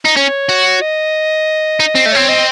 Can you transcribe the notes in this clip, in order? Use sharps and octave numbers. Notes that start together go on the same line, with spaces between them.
D#4
C#4 C#5
F#4
D#5
D#4
C4
A3
C4 C#5
D#5